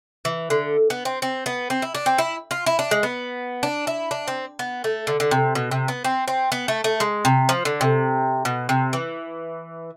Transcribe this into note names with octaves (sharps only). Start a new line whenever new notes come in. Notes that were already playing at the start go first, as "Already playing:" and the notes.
E3
D3
B3
C4
C4
B3
C4
E4
D4
C4
E4
F4
E4
D4
G#3
B3
D4
E4
D4
C4
B3
A3
D3
D3
C3
B2
C3
B3
C4
C4
B3
A3
A3
G#3
C3
F3
D3
C3
B2
C3
E3